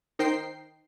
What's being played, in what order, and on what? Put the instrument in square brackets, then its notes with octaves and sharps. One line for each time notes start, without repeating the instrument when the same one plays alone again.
[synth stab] D#3 D#4 A#4 C5 G5 C7